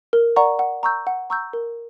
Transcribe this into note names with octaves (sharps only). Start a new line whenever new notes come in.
A#4
D5 F#5 A#5 C#6
F#5
A#5 C#6 E6 G6
F#5
A#5 C#6 E6 G6
A#4